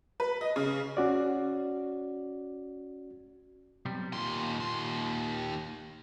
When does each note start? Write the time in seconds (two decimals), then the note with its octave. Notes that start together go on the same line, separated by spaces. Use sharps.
0.20 B4
0.41 D#5
0.56 C#3
0.97 C#4 F#4 D5
3.85 B1 C3 G3
4.13 D#2 A#2 C6
4.60 D#2 C6